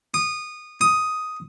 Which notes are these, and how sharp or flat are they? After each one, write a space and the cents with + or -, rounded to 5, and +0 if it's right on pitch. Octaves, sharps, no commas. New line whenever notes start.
D#6 -20
D#6 +5